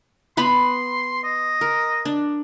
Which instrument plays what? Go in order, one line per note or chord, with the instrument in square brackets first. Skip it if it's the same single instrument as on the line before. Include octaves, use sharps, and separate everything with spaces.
[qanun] B3 B4 B5 [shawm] C6
[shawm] D#5
[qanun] A#4
D4